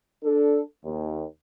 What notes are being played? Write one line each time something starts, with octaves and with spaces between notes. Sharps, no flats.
D4 A4
D#2